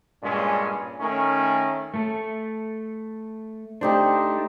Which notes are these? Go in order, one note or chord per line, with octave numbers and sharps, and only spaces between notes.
G2 A#2 G#3 C#4
D#3 A3 C#4
A3 A4
A3 D4 D#4 G4 C5